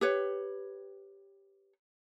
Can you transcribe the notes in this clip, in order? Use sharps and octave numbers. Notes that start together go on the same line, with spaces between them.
G4 B4 C#5